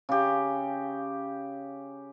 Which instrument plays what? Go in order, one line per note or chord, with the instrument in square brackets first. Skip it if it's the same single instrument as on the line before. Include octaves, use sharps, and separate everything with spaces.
[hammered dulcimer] C#3 G4